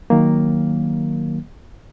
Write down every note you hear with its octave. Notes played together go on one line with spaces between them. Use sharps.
D#3 F#3 A#3